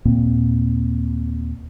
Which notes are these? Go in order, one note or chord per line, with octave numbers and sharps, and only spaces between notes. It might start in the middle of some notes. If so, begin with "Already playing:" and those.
D#2 A#2 A#3 C4